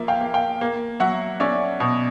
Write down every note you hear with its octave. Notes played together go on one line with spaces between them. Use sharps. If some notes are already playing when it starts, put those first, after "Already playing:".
Already playing: F3 A#3 E5
F5 G5
A#3
F5 G5
A#3
F#3 E5 F#5
C#4 D5 E5
B2